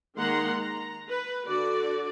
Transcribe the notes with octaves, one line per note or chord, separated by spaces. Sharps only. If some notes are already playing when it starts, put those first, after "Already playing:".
D#3 G#3 A#3 F#5 A#5 C6
A#5
B4
D3 F#4 D5